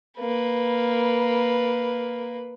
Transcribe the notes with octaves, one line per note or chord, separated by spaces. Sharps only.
A#3 B4